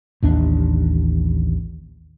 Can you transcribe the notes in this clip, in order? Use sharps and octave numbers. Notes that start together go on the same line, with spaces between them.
A1 D#2 D4